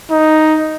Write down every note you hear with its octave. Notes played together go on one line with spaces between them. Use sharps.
D#4